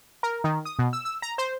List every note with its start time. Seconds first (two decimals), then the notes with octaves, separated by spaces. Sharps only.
0.23 A#4
0.44 D#3
0.65 D#6
0.79 B2
0.93 E6
1.05 E6
1.22 A#5
1.38 C5